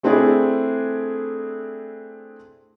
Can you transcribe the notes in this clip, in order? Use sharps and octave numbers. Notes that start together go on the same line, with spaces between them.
A3 C4 D4 E4 G#4 A4